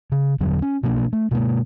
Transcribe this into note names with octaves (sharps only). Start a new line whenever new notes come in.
C#3
E2 G2 D3 F#3
C#4
B2 F3 A#3 D4
A3
B2 G#3 A#3